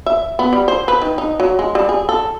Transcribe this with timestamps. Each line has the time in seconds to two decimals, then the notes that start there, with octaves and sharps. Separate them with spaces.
0.06 E5
0.39 B3
0.53 G3
0.68 C5
0.88 B4
1.02 D#3
1.18 D#4
1.40 F#3
1.59 G#3
1.75 G3
1.89 G#4
2.09 A4